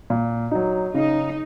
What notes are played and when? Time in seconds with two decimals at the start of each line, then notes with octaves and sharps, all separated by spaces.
0.10 A#2
0.51 F#3 D#4
0.94 C#3 D#4